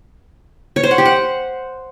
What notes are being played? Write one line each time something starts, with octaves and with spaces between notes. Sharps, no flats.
C#5
C5
F#5
G4
F#5